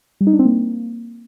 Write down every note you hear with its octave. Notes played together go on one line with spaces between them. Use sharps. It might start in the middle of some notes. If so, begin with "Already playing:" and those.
G3
D#4
D4
C4
A#3